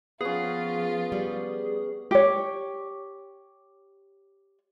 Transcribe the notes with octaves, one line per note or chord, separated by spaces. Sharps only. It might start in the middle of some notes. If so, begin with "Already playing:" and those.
F3 B3 C#4 F4 G#4
G3
G4 C#5